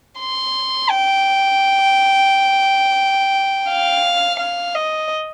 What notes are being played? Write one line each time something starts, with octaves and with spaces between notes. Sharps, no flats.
C6
G5
F5
F5
D#5